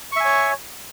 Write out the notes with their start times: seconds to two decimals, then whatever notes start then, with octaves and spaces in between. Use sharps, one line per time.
0.12 C#6
0.16 E5
0.20 G#5
0.25 C#5